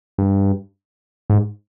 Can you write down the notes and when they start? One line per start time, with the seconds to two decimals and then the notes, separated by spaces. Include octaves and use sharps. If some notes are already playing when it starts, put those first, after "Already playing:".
0.18 G2
1.30 G#2